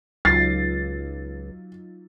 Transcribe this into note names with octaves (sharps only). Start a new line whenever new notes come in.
C#2 F#3 D#4 F4 A6 C7